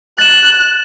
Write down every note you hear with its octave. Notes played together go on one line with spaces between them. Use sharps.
F#6 A6 E7